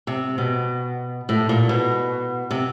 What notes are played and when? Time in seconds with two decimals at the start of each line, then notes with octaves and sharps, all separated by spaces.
0.07 C3
0.38 B2
1.29 A2
1.49 A#2
1.69 B2
2.51 C3